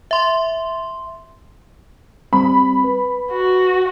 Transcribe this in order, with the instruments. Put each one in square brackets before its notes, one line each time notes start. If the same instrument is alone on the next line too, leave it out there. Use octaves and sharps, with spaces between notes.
[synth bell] E5 C6
[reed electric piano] G3 C4 [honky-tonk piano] B5
[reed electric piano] B4
[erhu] F#4